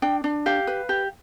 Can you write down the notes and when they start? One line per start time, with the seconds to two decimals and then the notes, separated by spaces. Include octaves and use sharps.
0.02 D4 G5
0.24 D4
0.46 G4 F5
0.67 B4
0.89 G4